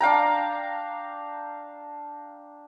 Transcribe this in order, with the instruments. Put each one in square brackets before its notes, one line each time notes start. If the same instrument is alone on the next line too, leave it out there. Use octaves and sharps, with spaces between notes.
[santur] D4 F5 G5 A#5